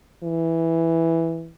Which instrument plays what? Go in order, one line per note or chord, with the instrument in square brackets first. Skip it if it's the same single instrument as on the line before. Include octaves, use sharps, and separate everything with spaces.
[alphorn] E3